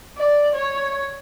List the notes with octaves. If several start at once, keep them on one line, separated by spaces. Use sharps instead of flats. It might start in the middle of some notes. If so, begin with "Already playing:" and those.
D5
C#5